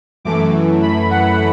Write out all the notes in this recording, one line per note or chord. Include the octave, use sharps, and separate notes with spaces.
F#2 E3 A3 D6
B5
F#5